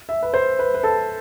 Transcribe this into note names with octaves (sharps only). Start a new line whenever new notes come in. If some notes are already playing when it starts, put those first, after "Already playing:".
E5
B4
C5
B4
B4
A4